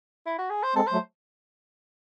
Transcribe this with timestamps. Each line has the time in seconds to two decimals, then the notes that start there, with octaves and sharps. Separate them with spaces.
0.26 E4
0.39 F#4
0.50 G#4
0.63 C5
0.75 G#3 C4 A4
0.87 C5
0.92 F#3 A3